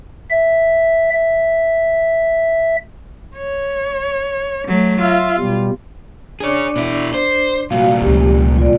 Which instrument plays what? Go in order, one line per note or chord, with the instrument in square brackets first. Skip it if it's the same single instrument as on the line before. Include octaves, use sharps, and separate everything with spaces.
[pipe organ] E5
E5
[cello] C#5
F#3 A3
[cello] F4 [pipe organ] E5 F5
[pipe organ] B2 G3
[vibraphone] D4 D5 D6 [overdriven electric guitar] G#4 C#5
[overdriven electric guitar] B2 E4
C5
[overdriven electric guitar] C2 A#2 [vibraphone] F#4 F5
[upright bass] C#2 F3 [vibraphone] G4
[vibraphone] F4 D5